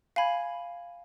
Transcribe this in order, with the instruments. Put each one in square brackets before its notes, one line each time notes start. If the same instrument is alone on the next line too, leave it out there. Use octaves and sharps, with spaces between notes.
[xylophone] F5 G#5 B5 G#6